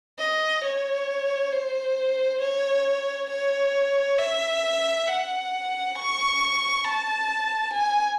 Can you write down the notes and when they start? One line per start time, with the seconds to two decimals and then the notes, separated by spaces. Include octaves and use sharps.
0.19 D#5
0.64 C#5
1.52 C5
2.41 C#5
3.30 C#5
4.18 E5
5.07 F#5
5.96 C#6
6.84 A5
7.73 G#5